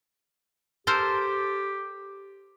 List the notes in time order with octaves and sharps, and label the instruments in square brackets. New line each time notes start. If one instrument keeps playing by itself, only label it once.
[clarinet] G4 [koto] A4 A#4 C5